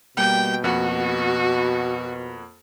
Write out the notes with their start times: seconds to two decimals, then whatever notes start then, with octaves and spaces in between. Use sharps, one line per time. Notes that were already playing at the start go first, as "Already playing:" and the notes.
0.17 B2 G3 A#3 G5
0.64 F2 A#3 F#4 F#5